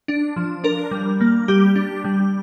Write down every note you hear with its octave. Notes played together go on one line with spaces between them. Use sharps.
D4
F3
D4 A#4
G3
A#3
G3 G4
D4
G3